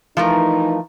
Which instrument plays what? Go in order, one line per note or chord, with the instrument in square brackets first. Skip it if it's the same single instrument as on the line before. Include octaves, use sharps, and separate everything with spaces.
[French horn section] E3 D#4 [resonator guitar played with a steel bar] F3 A3 A#4